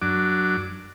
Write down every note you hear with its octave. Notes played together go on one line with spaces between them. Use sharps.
F#2 F#3 D4 D6